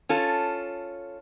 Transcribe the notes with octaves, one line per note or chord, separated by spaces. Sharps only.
C#4 F4 A4